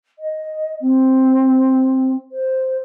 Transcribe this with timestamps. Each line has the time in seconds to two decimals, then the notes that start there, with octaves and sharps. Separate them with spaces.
0.18 D#5
0.80 C4
2.31 C5